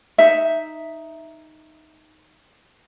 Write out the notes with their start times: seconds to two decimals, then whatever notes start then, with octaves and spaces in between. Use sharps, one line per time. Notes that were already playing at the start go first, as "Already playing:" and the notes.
0.18 D#4 E5